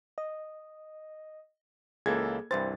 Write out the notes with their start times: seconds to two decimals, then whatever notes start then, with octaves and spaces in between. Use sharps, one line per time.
0.18 D#5
2.06 C#2 E3 A#3 G#4 A4 G#6
2.51 C2 G2 E3 C5 A6